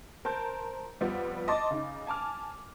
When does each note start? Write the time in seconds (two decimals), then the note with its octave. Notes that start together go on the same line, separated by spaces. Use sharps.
0.25 A#4 C5 A5 G6
1.01 F2 G3 B3 F4
1.48 D#5 A5 C6 D6 A6
1.70 C#3 D#4
2.07 G#5 A5 D6 F6